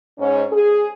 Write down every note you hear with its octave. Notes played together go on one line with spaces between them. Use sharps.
G#2 C#4
G#4